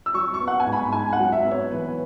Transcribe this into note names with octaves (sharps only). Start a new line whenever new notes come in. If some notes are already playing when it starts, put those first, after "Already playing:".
E6
F#3 C#6
C#6
B3
F#5
G#5
G#2
B5
G#2 G#5
F#5
F#3
E5
B3
C#5
E3 B4